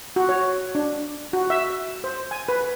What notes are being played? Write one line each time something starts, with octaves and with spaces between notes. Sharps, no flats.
F#4
C#5
D4
F#4
E5
C5
G#5
B4